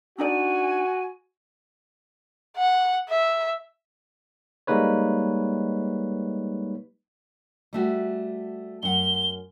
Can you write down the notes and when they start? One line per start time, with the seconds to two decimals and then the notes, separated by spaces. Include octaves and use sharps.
0.18 D4 D#4 F#4 D5 G#5
2.57 F#5
3.09 E5
4.67 G3 G#3 A#3 D#4 B4 C#5
7.73 G3 A3 F#4
8.83 F#2 F#5 G7